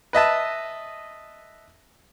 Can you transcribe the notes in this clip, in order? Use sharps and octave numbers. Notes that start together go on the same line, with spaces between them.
B4 D#5 E5 A5